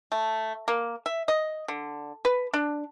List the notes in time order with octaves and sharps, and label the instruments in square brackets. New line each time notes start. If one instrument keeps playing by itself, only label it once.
[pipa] A3
A#3
E5
D#5
D3
B4
D4